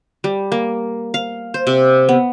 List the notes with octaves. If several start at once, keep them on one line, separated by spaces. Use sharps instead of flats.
G3
A#3
F5
C5
C3
B3